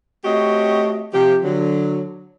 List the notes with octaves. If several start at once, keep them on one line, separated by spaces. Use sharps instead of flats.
A3 C4 F#4 G4 C#5 D#5
C3 F3 G4
D3 F#3